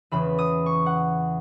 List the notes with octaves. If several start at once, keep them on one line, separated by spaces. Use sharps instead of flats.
E2 C#3 E3 B5
D#6
C#6
F#5